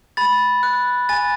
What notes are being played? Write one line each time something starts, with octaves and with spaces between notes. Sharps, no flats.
B5 A6
F#6
G#5 A6